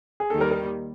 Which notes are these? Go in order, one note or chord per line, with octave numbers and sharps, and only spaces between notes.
G#4
D#2 D#3 G3 A4
A#4
A#4